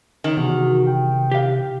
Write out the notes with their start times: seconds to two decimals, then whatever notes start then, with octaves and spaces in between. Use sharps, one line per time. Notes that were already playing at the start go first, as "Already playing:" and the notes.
0.24 D#3 C#4
0.37 E2 C3 F#4
0.87 G5
1.31 G4 F5